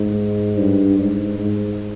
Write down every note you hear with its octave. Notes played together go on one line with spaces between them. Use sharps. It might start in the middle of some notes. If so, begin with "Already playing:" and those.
Already playing: G#2
G2
G#2
G#2